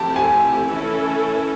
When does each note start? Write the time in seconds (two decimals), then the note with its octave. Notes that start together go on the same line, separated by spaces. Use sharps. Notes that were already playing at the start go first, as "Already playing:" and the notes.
Already playing: F3 A3 C4 E4 G4 A5
0.16 G#5
0.65 E3 A3 C#4 E4 A4